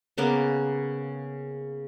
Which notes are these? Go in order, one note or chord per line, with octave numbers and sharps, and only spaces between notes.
C#3 A#3 B3 D6